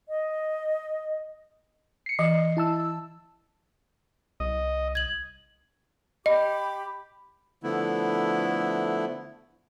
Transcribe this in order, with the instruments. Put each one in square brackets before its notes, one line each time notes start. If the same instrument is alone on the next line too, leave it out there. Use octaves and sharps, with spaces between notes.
[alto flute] D#5
[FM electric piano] C7 C#7
[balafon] E3 [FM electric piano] D#5
[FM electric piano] E4 A5 E6
[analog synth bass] C2 [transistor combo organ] D#5
[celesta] G#6 F#7
[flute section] G4 B5 D6 [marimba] D#5
[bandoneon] D3 F3 A3 B3 E4